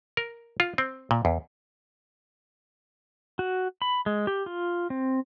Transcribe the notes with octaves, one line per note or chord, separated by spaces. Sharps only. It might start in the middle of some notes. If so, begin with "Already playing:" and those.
A#4
F4
C4
A#2
E2
F#4
B5
G#3
G4
F4
C4